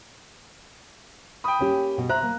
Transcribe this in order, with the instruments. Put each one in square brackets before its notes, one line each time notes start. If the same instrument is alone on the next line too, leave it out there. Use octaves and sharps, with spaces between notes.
[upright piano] G5 D#6 [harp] B5
[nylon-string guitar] A#3 C#4 G4
B2
[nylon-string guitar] C5 E5 [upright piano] A#5 [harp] F#6
[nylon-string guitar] A#3